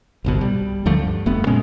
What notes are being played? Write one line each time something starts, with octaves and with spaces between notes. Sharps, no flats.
G1 C2 B2
G3
D2 D3 F3 A3
G2
F1 A3 B3
A#2 G#3 C#4